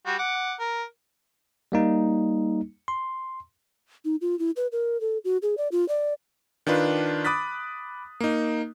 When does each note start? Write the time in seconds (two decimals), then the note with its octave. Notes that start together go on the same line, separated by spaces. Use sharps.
0.06 G3 F#4
0.18 F#5 D6
0.60 A#4
1.72 G3 A#3 D#4
2.88 C6
4.05 D#4
4.21 F4
4.39 E4
4.57 B4
4.72 A#4
5.01 A4
5.24 F#4
5.42 G#4
5.57 D5
5.72 F4
5.88 D5
6.67 D#3 D4 F4 B4
7.25 B5 D6 D#6 F#6 A6 B6
8.20 A#3 D#4